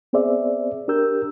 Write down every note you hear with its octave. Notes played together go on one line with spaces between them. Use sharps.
B3 C4 G#4 C5 D5 E5
D4 G4 A#4 E6 G6